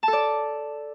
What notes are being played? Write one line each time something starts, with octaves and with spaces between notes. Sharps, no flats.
A5
A4
D5